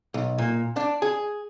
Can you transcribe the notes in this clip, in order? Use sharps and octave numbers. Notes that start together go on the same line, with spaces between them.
B1
A#2
D4
G#4